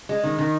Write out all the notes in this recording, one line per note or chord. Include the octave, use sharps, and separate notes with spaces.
G#3
D#3
D#3